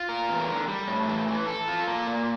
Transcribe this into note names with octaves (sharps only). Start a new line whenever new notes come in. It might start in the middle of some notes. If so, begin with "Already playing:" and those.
Already playing: F4
A#4
E2
D3
G3
A2
E3
E3
A4
F4
A#3
A#2